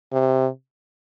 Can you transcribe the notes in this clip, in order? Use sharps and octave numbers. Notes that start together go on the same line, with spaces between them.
C3